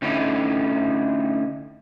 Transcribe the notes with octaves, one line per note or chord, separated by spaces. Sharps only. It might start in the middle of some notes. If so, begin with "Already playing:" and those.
D3 A3 C#4 D#4 E4